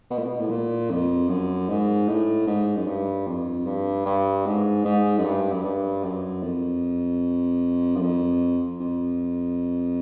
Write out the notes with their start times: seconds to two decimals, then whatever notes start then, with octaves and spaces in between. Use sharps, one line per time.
0.10 B2
0.19 A#2
0.27 B2
0.40 A2
0.50 A#2
0.90 F2
1.29 F#2
1.69 G#2
2.09 A2
2.47 G#2
2.76 F#2
2.87 G2
3.27 F2
3.67 G2
4.06 G2
4.46 G#2
4.85 G#2
5.18 F#2
5.24 G2
5.52 F#2
5.64 G2
6.04 F#2
6.43 F2
7.96 F#2
8.02 F2
8.80 F2